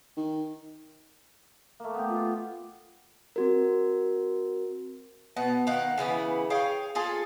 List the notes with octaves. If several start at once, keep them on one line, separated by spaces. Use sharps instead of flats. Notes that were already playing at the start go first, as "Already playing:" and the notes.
D#3
A3 A#3
B3 G4
F4
C4 F#4 A#4
B2 B3 F#5
D#3 F5 F#5
C#3 E3 B3 E4
G#4 C#5 F5 G5
F4 G#4 A4